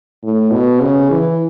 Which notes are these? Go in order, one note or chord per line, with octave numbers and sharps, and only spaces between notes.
A2
B2
C#3
E3